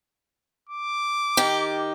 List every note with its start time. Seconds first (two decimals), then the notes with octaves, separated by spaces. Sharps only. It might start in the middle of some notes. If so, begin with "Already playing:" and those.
0.69 D6
1.37 D#3 G4